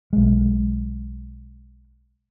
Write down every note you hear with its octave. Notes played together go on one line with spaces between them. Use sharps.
B1 G#3